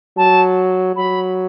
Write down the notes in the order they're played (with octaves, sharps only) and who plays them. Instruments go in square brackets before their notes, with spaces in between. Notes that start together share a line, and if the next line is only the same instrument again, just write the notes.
[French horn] F#3 [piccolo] A5
[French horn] F#3 [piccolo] B5